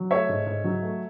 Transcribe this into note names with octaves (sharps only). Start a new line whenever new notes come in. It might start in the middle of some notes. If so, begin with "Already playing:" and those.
Already playing: F#3
A3 C#5 E5
G#2
G#2
F#3
A3